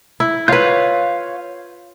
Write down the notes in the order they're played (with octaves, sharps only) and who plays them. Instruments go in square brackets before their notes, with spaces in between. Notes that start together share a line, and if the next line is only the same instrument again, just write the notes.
[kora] E4
[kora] F4 B4 [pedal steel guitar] C#5 F5 G6